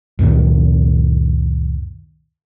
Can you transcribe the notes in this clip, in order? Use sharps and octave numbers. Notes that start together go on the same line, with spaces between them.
C#2 F#2 A#2 D#3